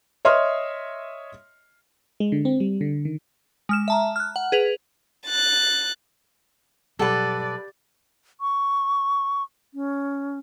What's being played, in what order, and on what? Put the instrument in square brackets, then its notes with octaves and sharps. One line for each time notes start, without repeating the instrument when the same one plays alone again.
[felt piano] C#5 D#5 E5 C6 D#6 F6
[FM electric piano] G#3
D3
C4
G3
D3
D#3
[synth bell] G#3 F6 E7
E5 A5 A#5
F6 F#6
F#5
G#4 B4 F7
[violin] F#6 A6
[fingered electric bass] B2 F#3 G3 [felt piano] G4 F#5 [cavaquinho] A4 B4 [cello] D5
[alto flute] C#6
C#4